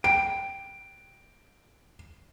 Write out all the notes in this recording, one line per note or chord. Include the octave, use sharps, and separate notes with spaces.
G5 D7